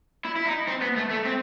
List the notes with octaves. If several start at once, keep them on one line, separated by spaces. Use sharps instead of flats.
E4
E4
D#4
C4
B3
A3
A3
C4